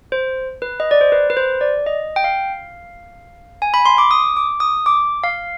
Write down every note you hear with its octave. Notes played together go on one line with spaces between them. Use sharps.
C5
B4
D#5
D5
C5
B4
B4
C5
D5
D#5
G5
F5
G#5
B5
C6
D6
D#6
D6
D#6
D6
F5